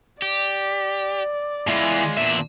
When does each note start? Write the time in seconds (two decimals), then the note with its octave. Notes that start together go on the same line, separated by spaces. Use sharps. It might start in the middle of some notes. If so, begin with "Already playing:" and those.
0.22 G4 D5
1.68 E2 E3 G#3 F4
2.18 E2 A#2 D4 E5